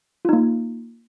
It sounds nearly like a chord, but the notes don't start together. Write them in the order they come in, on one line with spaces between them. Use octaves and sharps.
F4 D#4 A#3